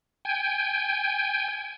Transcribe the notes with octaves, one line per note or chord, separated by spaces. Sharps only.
G5 G#5